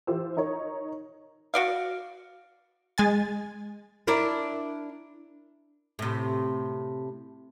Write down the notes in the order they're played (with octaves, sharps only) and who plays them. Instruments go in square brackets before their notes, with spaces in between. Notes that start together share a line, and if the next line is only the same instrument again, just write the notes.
[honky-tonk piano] E3 F4 G4 C5 E6
D#4 A#4 C#5
[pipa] F#4 D5 F5
[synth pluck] G#3 G#5 A6
[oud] D4 E4 A#4
A2 C3